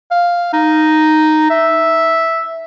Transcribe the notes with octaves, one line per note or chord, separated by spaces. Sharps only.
F5
D#4
E5